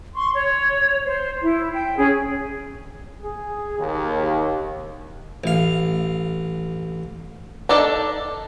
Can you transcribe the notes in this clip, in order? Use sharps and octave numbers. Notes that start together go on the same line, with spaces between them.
C6 C#6
C#5
C5
E4
G5
C#4 G#4
G#4
D#2
A1 F5
D4 D#4 A4 D5